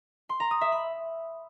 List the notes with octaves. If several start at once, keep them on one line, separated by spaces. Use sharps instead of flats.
C6
A#5
D#6
E5
B5